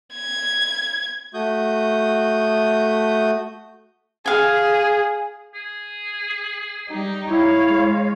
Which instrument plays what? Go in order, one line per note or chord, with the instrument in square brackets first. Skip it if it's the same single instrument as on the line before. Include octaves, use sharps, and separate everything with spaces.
[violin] G#6
[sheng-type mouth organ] A3 F#4 D#6 G6
[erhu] G#4 [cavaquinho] F5 G#5
[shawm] G#4
[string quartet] G3 D#4 G4
[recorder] E4 [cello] C#5 F5
[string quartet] G#3